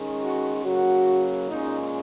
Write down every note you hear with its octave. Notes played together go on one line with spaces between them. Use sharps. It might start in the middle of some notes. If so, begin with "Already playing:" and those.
Already playing: D#3 G#3 C#4
F#4
C#3 F#3 A#3 F#4
A#2 G#3 C#4 D#4